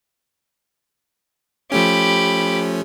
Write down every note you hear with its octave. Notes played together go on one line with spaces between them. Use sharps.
F3 A3 C#4 G4 B5